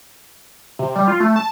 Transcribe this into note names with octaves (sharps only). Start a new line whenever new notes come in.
C3
G3
F4
A3
A5